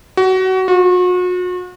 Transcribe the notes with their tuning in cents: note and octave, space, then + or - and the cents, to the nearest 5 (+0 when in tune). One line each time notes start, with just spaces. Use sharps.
F#4 +25
F#4 -40